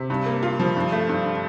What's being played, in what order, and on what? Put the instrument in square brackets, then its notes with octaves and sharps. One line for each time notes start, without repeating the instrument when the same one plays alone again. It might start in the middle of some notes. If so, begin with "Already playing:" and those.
Already playing: [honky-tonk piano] C3
G2
A#3
F4
F3
G2
A3
G2
D3